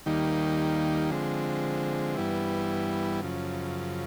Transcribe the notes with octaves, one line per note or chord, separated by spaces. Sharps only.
D#2 D#3 G3 A#3 D#4
D3 F3 G#3 C4
G2 E3 G3 B3 E4
F#2 C#3 F3